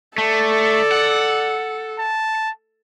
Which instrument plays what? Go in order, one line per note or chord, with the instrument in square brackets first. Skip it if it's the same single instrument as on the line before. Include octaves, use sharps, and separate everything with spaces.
[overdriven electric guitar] A3 [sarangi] A4 [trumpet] D5
[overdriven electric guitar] F#5
[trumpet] A5